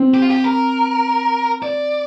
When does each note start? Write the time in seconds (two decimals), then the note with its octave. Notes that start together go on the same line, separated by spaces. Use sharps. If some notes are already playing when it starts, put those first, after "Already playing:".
Already playing: C4
0.14 G4
0.22 F4
0.30 G4
0.44 A#4
1.63 D5